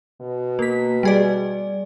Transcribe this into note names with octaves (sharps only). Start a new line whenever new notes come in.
B2
A#3 B6
G3 G#4 D5